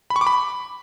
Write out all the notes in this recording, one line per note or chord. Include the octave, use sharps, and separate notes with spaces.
B5
C#6
D6
B5